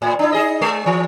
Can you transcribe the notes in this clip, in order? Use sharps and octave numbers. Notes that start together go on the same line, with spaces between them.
A2
D4 E4
D#4 G#4 D#5
G#3
E3